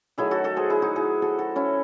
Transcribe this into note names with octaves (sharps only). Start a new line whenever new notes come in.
D#3 F#3 A3 E4 G#4
F#4 A4
F#4 A4
G#4 C5
E4 G#4
D#4 F#4
E4 G#4
F#4 A4
F#4 A4
C#4 E4